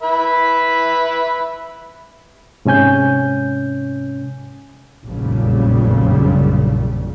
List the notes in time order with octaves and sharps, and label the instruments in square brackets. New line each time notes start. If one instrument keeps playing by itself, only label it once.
[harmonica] B4 E5 B5
[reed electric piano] G#2 C3 C#4 G#5 G6
[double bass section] F1 A#1 F#2 C#3 G3